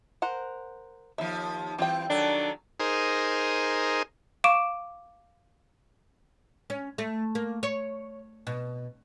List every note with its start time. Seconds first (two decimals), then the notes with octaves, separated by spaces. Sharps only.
0.22 A#4 C5 F#5
1.18 D#2 F3 E5
1.78 E3 G3 C4 F4 G5
2.10 D#3 F#3 D4 A4
2.80 D#4 G#4 A#4 C5
4.44 F5 C#6 D6 D7 E7
6.70 C#4
6.98 A3
7.35 A#3
7.63 C#5
8.47 B2